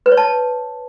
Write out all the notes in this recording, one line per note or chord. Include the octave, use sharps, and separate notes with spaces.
B4
C#5
A5